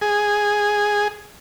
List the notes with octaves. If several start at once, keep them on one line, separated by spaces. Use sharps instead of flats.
G#4